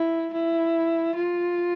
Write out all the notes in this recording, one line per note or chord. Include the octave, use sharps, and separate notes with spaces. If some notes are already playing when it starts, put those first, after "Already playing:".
Already playing: E4
E4
F4